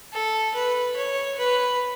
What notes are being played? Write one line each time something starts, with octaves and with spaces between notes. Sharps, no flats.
A4
B4
C#5
B4